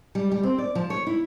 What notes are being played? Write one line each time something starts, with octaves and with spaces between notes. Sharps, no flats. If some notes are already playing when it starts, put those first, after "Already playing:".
G3
G3
C4
D5
F3
C#5
E4